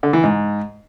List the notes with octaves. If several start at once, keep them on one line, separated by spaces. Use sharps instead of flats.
D3
E3
G#2